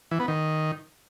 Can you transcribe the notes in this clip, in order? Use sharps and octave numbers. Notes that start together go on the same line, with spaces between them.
E3
B3
D#3